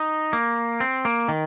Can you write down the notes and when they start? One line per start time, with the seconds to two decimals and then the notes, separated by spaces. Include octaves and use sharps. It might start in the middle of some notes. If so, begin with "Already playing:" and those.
Already playing: D#4
0.33 A#3
0.80 C4
1.05 A#3
1.28 D#3